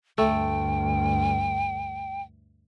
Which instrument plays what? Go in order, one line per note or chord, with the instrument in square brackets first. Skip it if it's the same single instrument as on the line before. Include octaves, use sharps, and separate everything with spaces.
[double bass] D2 G2 [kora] A3 [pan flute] G5